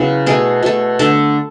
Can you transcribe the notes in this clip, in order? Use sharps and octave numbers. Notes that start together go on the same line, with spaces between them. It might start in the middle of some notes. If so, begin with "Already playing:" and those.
Already playing: C#3 F#3 B3 E4
B2 A3 G#4
B2 A3
D3 A3 A4